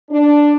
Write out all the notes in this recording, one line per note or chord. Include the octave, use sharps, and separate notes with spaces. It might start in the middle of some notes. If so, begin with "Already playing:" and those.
D4